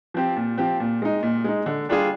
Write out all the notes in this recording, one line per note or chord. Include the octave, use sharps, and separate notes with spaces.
F3 C4 G4
A#2
F3 C4 G4
A#2
G#3 D#4
A#2
G#3 D#4
D3
G3 D4 F4 G#4